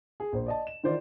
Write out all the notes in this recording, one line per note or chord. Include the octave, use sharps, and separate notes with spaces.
G#4
A#1 C5
D5 D#5 A5
E7
D#3 E3 F4 C5 D5